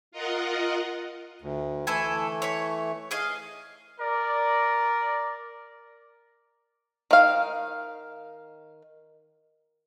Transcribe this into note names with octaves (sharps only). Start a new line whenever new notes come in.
F4 A#4 D#5 F#5
D2
E3 A3 E4 A4 G#5
C#5 B5
G#4 D#5 F5
A#4 D5
D#3 F5